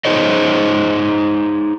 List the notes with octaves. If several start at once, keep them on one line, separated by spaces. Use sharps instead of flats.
D#4 G#4 C5 C#5 D#5